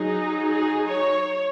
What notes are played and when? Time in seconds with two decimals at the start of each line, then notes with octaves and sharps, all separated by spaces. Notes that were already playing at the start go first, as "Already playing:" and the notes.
Already playing: F#3 D#4 G#4
0.50 G#4
0.87 C#5